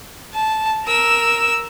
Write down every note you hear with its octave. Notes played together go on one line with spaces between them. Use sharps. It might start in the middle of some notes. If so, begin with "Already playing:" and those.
A5
A#4 E6